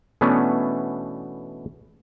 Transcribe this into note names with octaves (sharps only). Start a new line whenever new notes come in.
B2 E3 A3 B3 C#4 D4